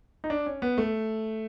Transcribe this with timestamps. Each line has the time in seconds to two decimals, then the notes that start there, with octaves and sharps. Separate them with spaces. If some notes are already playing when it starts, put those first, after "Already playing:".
0.24 D#4
0.30 D4
0.46 C#4
0.62 B3
0.78 A3